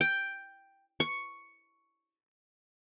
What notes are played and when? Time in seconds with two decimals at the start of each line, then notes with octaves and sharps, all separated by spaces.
0.01 G5
1.00 C#6